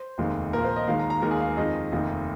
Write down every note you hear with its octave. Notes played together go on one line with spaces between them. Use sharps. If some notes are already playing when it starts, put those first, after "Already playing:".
Already playing: C5
F1 D#2 D#3 G#3
A#1 A#2 F3 A#4
C5
D#5
D#2 D#3 G#3 F5
A#5
A#5
D#2 D#3 G#3 A#4
G#4
F5
A#4
F2 D#3 G#3 D#5
F1 D#2 D#3